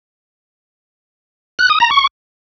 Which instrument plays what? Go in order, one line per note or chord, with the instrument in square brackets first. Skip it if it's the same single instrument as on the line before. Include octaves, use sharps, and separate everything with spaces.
[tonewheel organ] F#6
D#6
A#5
C#6